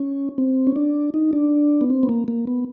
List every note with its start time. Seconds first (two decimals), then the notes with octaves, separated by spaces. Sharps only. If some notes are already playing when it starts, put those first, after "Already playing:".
Already playing: C#4
0.38 C4
0.67 C#4
0.76 D4
1.14 D#4
1.33 D4
1.81 B3
1.90 C4
2.03 B3
2.09 A#3
2.28 A#3
2.47 B3